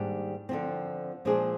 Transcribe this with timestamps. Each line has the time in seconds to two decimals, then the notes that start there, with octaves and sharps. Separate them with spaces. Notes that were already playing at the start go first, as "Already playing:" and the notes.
Already playing: G#2 D#3 G3 A#3 D4
0.49 D3 F3 C4
1.25 A#2 F3 G#3 D4 G#4